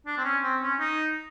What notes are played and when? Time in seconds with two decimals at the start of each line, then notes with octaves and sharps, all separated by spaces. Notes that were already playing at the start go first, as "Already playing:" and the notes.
0.07 D4
0.18 C4
0.24 C#4
0.43 C4
0.62 C#4
0.79 D#4